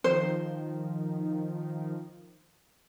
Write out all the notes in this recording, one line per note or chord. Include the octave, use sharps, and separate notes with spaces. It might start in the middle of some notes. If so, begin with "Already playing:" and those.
D#3 F3 C5